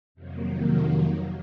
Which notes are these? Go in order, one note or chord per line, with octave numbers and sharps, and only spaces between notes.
F2 C3 D#3 F#3 A#3